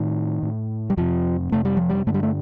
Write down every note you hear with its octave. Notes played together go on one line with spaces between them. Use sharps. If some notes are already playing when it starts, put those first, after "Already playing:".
Already playing: A2 D#3
A2
G3
F2 C3 F3
F2 C3 A3
G3
F3
G3
G2 D3 A3
G3
A3